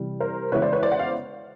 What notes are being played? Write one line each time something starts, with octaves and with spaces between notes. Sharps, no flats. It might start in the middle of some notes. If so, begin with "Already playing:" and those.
Already playing: C3 E3 G3
A#4 C5
C#3 E3 G#3 B3 E4 B4 C#5
C5 D5
B4 C#5
C5 D5
F#5
F5